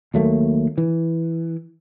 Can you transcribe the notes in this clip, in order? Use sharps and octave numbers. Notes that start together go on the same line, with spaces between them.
D#2 F#3 A3 A#3
E3